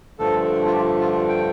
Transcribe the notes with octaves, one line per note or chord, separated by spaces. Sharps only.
G2 D3 F3 A3 A4
F4
G4
F4
G5